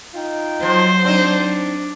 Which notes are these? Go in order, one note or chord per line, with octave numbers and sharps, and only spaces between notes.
D#4 F4 G5
F3 F#3 C5
C4 D4 D#4